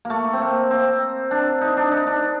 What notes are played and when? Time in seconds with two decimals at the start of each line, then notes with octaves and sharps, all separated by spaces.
0.05 A#3
0.10 A3
0.33 C4
0.40 A#3
0.71 C4
1.31 D4
1.61 D#4
1.77 D4
1.91 D#4
2.07 D4